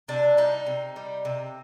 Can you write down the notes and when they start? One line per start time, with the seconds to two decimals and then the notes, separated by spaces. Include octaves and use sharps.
0.08 C3 D4
0.37 G3 D#4
0.66 C3
0.96 G3
1.25 C3